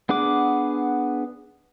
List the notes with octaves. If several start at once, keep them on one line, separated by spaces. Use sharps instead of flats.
B3 D4 G#4 F#5 D6